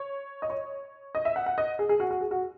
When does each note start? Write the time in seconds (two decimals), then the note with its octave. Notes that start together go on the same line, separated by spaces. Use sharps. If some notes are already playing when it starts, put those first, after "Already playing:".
Already playing: C#5
0.42 D#5
0.50 C#5
1.15 D#5
1.25 E5
1.36 F#5
1.46 F#5
1.58 D#5
1.79 G#4
1.89 G#4
2.00 F#4
2.11 F#4
2.21 G#4
2.31 F#4